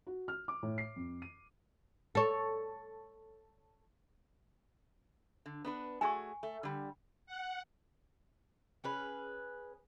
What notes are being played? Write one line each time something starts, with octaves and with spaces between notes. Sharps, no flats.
F#4
F6
D6
A2
C7
F2
D#7
A4 C#5
D3
B3 D4 B4
A3 F#4 G#4 G#5 C#6
A3
D3 G3
F#5
C#4 G#4 B4